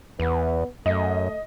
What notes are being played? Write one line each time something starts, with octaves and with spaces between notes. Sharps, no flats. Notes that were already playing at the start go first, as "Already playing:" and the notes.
E2 B3
F#2 A3 D#5